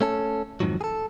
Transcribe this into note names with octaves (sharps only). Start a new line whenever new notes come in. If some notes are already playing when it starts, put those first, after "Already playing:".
A3 C#4 A4
F2 G#2 B2 D#3 F3 F#3
G#4 A4